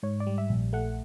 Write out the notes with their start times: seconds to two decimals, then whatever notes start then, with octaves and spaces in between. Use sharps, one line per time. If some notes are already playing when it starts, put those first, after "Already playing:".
0.03 G#2 C#5
0.20 D5
0.27 G3
0.38 E5
0.50 A#1
0.73 A3 F#5